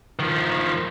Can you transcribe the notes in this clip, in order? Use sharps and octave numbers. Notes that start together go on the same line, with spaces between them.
D#3 F3